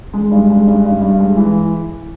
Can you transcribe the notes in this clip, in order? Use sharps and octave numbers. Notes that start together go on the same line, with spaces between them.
G#3
G2
G#3
G2
G2
G2
G#3
E3